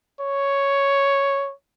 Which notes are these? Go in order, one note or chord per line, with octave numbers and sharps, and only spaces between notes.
C#5